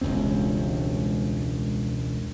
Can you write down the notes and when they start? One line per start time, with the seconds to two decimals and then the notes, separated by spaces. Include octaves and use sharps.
0.01 E1 C#2 G2 C4